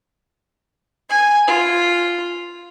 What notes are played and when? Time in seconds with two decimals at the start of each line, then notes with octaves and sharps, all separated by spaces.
1.09 G#5
1.47 F4